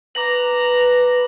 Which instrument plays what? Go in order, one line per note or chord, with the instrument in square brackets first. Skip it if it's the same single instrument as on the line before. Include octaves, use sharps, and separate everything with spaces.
[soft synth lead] B4 [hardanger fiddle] A#5 [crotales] D6 A#6 F#7